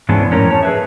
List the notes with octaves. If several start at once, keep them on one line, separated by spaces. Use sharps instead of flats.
G#2 E3 G#3 B3 C#4 D4
F2 A2 C#4 A#4
C#5 A5
G#4 B4 E5